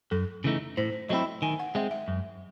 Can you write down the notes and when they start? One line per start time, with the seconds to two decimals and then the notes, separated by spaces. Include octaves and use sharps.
0.11 F#2 A4
0.44 C#3 E3 A3 D#4
0.77 A2 C5
1.09 F#3 A3 C4 E4 D#5
1.42 D#3 G#5
1.59 F#5
1.75 G#3 C4 E5
1.91 E5
2.08 F#2